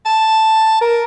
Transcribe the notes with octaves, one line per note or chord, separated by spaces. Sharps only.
A5
A#4